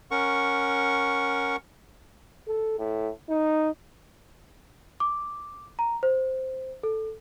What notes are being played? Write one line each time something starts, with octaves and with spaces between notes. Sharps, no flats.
C#4 A#4 F#5 C#6
A4
A2
D#4
D6
A#5
C5
A4